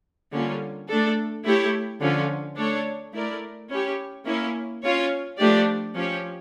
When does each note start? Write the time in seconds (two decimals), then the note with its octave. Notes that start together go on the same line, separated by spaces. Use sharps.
0.33 D3 G3 A#3 C#4 F4
0.89 A3 D4 A4
1.45 A3 E4 G4 C#5
2.01 D3 F3 C#4 F4
2.58 A3 D4 A4 C#5
3.14 A3 E4 A#4 D5
3.70 C#4 E4 G4 C#5
4.26 A#3 C#4 E4
4.83 C#4 F4 C#5
5.39 F3 A3 D4 G4 D5
5.95 F3 C#4 G4 C#5